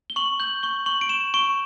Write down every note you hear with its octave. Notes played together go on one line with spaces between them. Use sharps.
G7
C#6 F#7
G6 F#7
C#6 G7
C#6 F#7
D7
C#6 E7
C#6 D7